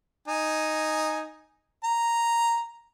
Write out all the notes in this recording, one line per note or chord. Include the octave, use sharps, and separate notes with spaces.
D#4 G#5
A#5